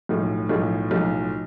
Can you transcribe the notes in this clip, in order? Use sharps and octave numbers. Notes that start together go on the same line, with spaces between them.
B1 A2 F3
B1 A2 F3
B1 A2 F3